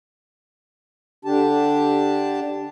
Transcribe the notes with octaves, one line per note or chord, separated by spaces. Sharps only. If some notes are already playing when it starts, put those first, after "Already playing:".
D3 D4 G4 A5